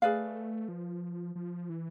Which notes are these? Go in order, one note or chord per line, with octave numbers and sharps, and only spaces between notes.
A3 G#4 B4 D5 F5
F3
F3
E3